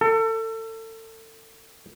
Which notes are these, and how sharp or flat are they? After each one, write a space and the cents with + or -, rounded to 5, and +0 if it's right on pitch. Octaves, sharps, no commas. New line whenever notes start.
A4 +30